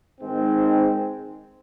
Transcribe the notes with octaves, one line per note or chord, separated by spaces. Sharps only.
G#2 D#3 G#3 C4